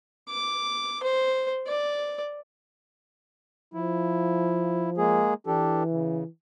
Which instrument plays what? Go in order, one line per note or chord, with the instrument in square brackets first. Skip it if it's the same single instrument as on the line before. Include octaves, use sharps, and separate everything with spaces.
[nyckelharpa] D6
C5
D5
[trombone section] F3 [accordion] E4
[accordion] G#3 A#3 G#4
[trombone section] E3 [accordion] D4 G4 A4
[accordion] C#3